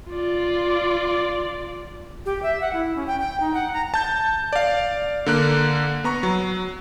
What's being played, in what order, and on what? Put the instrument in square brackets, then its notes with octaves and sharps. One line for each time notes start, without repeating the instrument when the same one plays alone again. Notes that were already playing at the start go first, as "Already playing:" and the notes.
[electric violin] F4 D5
[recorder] G4
E5
F#5
E4
C#4
G5
G5
D#4
F#5
A#5
[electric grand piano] A5 G6
D5 F5
D3 A#3 F#6
B3 A#5 C#6
F#3